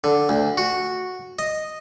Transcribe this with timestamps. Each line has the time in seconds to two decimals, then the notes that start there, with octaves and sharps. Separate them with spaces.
0.04 D3
0.29 D2
0.57 F#4
1.39 D#5